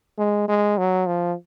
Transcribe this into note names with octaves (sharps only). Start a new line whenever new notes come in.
G#3
G#3
F#3
F3